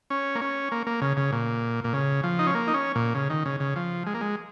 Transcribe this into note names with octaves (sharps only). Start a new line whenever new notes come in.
C#4
A#3
C#4
A#3
A#3
C#3
C#3
A#2
A#2
C#3
F3
D#4
C#4
A#3
D#4
C#4
A#2
C#3
D#3
C#3
C#3
F3
G#3
A#3
G#3